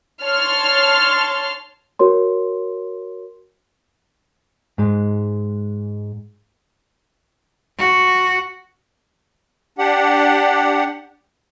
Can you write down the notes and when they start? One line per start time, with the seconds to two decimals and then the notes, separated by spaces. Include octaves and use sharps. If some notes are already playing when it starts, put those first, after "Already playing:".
0.22 C#5 A5 C6 F6
1.99 F#4 A#4 C#5 C6
4.78 G#2 G#3
7.78 F#4
9.78 D4 G4 F#5